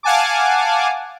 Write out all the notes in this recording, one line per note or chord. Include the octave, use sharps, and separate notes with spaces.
F5 F#5 G#5 A5 D6